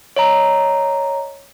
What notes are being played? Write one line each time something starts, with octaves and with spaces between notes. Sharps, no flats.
C#5 D#5 A#5